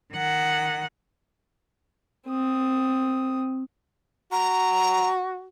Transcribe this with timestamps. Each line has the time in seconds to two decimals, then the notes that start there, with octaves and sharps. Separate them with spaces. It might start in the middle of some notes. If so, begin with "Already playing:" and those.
0.13 D#3 F#5
2.28 C4 D#6
4.32 F#4 A#5